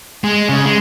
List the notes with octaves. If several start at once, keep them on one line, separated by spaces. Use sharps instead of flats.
G#3
C#3
G#3